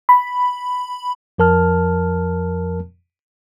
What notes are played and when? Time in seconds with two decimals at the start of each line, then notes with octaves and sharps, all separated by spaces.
0.09 B5
1.38 F2 F3 A#4 A5 F6